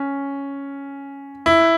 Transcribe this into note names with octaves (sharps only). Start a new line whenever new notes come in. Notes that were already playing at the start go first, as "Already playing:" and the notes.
Already playing: C#4
E4